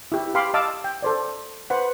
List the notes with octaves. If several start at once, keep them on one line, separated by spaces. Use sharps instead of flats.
E4 G4
G4 F5 B5 C6 D6
D#5 F5 A5 D6 E6
G5
A4 C5 D5
B4 C5 F#5